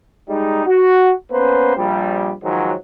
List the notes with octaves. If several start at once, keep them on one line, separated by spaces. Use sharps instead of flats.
G3 G#3 D#4
F#4
A#3 B3 C#4 B4 C5
A#1 G3
G#2 D#3 F3 F#3